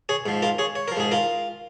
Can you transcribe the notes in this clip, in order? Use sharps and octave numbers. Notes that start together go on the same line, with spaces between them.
G#4 C#5
G#2 F3
F4 A#4
G#4 C#5
C#5
F3 A#4
G#2 G#4
F4 A#4